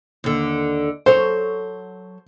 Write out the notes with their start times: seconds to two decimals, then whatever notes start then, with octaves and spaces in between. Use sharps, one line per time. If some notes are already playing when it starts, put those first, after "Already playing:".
0.24 D#2 D3
1.06 F#3 A4 C5 C#5